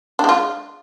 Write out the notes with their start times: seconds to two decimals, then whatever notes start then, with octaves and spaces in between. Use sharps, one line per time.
0.19 D4
0.24 G#3
0.29 F4